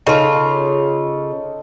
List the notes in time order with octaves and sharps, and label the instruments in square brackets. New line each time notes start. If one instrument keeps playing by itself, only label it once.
[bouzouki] C#3 F4 [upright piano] D#4 A4